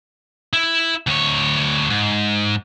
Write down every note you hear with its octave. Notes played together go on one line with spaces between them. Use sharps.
E4
D2 C#5
G#2